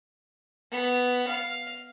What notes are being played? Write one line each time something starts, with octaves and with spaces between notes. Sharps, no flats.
B3
F5